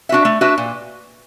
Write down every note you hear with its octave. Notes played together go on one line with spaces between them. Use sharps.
D4 F#4 B4 E5
A3
D4 F#4 B4 E5
A#2